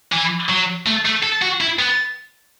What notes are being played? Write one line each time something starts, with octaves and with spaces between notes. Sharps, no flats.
E3
F#3
A3
A3
A4
F#4
E4
B3